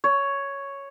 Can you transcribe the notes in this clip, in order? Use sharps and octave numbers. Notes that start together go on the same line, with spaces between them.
C#5